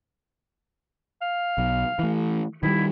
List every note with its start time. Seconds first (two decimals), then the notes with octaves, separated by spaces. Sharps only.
1.21 F5
1.58 B1
1.99 E3 A3
2.63 D#3 F3 G3 E4